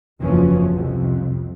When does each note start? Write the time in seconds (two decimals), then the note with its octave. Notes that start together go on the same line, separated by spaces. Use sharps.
0.21 F#1 E2 E3 F3 C#4
0.74 C2 F2 C3